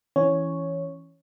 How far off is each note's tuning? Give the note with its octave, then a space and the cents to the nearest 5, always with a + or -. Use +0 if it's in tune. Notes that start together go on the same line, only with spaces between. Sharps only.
E3 +0 C#4 +0 C#5 +0